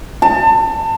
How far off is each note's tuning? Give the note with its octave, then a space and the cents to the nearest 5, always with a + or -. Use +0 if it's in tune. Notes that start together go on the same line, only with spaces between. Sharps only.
A5 +30